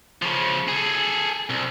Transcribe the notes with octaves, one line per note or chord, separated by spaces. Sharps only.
C#3 F3
G#4 A4
C2